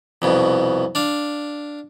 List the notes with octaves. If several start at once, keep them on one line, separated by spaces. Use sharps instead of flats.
C2 F2 B2
D4 F5